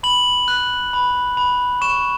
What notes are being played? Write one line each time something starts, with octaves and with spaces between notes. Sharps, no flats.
B5 F#7
F#6
B5
B5
C#6 E7